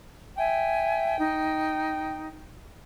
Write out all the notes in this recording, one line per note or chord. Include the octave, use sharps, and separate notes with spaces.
E5 G5 G#5
D#4